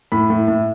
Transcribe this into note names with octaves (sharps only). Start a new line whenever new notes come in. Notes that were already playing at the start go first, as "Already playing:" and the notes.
A2 B5
A2
A2